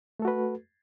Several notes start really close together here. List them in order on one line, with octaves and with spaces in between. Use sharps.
A3 A4 F#4 B4